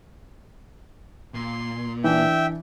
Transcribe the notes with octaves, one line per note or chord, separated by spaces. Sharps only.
A#2 C6
E3 D4 E5 G5